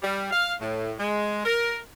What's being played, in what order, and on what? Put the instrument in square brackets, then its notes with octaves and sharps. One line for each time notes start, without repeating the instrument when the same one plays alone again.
[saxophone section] G3
F5
A2
G#3
A#4